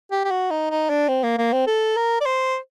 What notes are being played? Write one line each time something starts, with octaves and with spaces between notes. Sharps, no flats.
G4
G4
F#4
D#4
D#4
D4
C4
A#3
A#3
C4
A4
A#4
D5
C5